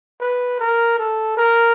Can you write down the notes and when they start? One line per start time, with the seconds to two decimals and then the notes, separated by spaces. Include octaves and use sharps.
0.21 B4
0.60 A#4
0.99 A4
1.37 A#4